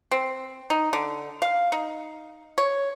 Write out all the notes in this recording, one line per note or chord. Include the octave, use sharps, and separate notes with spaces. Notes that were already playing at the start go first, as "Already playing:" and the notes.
C4
D#4
D3
F5
D#4
C#5